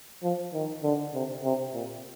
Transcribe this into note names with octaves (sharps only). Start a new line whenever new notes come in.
F3
D#3
D3
C3
C3
A#2